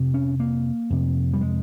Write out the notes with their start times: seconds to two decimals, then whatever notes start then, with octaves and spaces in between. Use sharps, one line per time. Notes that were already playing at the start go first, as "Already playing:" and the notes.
Already playing: F2 C3
0.14 C#4
0.40 A#3
0.90 F2 C3
1.34 G3
1.41 G#3